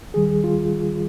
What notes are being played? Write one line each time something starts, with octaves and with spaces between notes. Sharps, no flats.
D#2 D#3 G3 G#4
F4